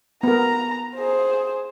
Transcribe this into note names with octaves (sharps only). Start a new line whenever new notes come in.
B3 A#4 A#5
G#4 C5